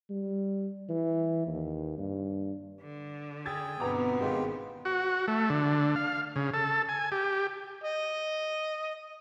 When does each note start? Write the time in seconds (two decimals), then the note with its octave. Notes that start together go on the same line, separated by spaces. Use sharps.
0.10 G3
0.89 E3
1.47 D#2
1.98 G2
2.81 D3
3.46 G#4 G5 E6 G#6 A6
3.80 G1 B2 B3 C4 A#5 D6
4.21 G#1 G#3 F4 G4
4.85 F#4
5.28 A3
5.50 D3
5.96 F5
6.36 C#3
6.54 A4
6.89 G#5
7.12 G4
7.84 D#5